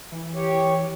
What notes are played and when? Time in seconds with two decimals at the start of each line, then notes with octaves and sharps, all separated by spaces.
0.12 E3
0.34 G4 C#5